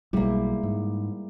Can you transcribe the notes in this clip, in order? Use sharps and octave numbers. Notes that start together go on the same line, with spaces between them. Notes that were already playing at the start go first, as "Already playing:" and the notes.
B1 G3 G#3 A#3 E4
G#2